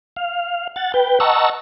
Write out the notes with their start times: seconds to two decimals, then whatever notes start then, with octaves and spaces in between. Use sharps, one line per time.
0.16 F5
0.76 F#5 A6
0.94 B4 G5
1.20 D#5 F#5 A5 A#5 C#6 E6